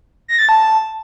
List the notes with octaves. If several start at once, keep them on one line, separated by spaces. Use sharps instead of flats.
A#6
A6
A5